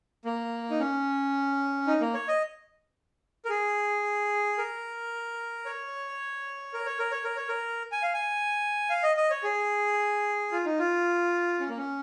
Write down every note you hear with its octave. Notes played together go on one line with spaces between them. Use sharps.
A#3
D#4
C#4
D#4
A#3
C#5
D#5
A#4
G#4
A#4
C#5
A#4
C#5
A#4
C#5
A#4
C#5
A#4
G#5
F5
G#5
F5
D#5
D#5
C#5
G#4
F4
D#4
F4
C#4
A#3
C#4